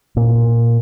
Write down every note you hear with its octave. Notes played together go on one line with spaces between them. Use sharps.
A#2